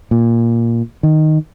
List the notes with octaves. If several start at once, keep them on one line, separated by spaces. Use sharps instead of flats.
A#2
D#3